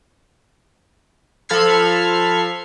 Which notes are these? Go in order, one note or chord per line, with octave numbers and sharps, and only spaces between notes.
F3 A4 B5 F6 G#6 C7